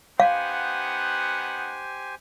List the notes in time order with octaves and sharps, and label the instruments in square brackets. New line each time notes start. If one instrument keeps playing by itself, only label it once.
[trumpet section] B3 D#4 F#5 [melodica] G4 C5 G#5 [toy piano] F5